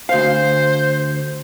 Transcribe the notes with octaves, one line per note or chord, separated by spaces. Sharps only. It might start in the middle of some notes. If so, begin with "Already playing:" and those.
D2 C5 F5